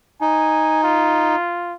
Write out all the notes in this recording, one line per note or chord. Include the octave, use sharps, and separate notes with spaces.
D#4 G#5
F4